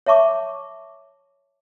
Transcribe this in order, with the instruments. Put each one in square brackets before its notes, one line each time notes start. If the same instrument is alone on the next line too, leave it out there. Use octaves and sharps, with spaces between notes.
[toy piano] C#5 E5 A5 C#6 D6